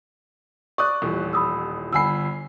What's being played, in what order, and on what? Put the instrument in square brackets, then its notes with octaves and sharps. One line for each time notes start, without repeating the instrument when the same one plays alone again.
[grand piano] D5 D#6 F#6 [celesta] C#6
[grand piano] D#1 A1
[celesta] B5 D#6 E6
[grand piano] G1 B5 C7 [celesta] G#5 E6